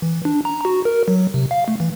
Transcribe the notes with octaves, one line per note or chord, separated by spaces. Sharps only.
E3
D4
A#5
F#4
A#4
F#3
C3
F5
A3
E3